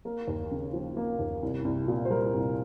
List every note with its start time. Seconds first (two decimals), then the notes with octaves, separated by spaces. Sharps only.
0.05 A#3 A#4
0.28 D#2
0.51 C#3
0.73 F3
0.97 A#3
1.19 D#2
1.43 C2
1.65 C2
1.88 A#2
2.05 C5
2.10 G3 A#4
2.34 C2